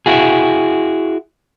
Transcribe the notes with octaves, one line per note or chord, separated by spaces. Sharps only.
E4 F#4 G#4